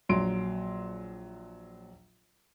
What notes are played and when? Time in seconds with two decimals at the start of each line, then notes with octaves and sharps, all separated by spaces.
0.09 A#1 F#3 C6 D7